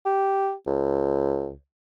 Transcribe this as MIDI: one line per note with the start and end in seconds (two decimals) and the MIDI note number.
0.05 0.52 67
0.66 1.52 37